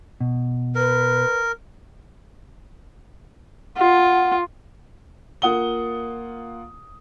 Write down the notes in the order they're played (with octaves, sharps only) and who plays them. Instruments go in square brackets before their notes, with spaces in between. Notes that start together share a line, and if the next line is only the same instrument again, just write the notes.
[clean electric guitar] B2
[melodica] A#4 [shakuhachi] B4
[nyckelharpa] F4 [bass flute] F#5
[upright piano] A#3 F4 F#5 D#6 G7